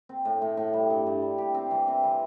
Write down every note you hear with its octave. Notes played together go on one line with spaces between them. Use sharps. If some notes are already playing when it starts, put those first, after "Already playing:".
C4
A2
A2
A2
G3
G2
G2
G3
G4
C4
E3
C4
E3